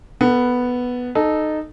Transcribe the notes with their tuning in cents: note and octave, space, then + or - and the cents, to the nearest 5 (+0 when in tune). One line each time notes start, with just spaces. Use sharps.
B3 +0 A4 +30
D#4 -15 A4 -20